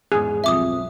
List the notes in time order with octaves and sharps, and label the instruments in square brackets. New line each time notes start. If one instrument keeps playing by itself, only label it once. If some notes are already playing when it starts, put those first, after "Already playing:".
[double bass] E2 G#2 [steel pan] G#4
[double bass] B1 [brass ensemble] F2 [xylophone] E5 D6 D#6